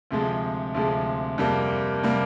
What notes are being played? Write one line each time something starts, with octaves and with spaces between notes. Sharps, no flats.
D2 C3 F3 G#3
D2 C3 F3 G#3
F2 C3 G3 A#3
C3 G3 A#3